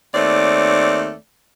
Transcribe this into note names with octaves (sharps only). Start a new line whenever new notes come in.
D#2 A3 C4 C#5 D5